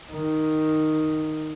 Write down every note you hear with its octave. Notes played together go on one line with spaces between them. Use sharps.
D#3